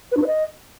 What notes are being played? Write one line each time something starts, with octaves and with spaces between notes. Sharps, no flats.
B4
D4
B4
D#5